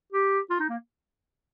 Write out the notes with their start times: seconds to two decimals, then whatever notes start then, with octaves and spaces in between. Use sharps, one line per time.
0.12 G4
0.50 F4
0.60 D#4
0.70 A#3